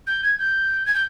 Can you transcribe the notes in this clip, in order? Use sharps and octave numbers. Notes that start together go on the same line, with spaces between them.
G6
G#6
G6
G#6
G6